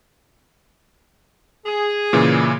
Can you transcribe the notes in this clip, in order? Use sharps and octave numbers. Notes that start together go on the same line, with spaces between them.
G#4
A#2 C#3 E3